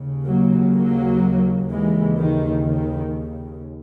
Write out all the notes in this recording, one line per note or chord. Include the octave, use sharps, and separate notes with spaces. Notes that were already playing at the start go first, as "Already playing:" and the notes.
Already playing: D#2 C#3
F#3 A#3
F#3 A#3
D#2 C#3 E3 G#3
D#3
D#3